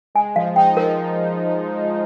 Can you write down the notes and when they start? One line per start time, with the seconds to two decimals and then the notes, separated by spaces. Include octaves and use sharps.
0.15 G#3 G#5
0.36 F3 F5
0.56 D#4 G5
0.77 F3 A#4